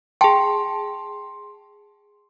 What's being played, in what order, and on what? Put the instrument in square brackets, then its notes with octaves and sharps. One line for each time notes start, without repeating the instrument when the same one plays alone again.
[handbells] G#4 A5 [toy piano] G5 [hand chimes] C6